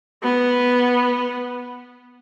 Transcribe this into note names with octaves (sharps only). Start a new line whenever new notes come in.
B3